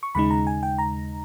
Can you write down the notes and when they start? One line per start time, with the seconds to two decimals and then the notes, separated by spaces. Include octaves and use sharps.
0.03 C#6
0.15 D#2 C#3 G#3 D#4 B5
0.31 A#5
0.47 G#5
0.63 G5
0.78 A#5